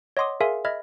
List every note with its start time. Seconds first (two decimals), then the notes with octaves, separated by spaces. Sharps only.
0.17 C#5 D#5 F#5 C6 D6 D#6
0.40 G#4 A#4 E5 F5 G#5 C6
0.65 D#5 E5 B5 F6 G#6 A6